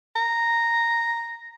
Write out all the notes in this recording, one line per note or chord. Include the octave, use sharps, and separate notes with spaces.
A#5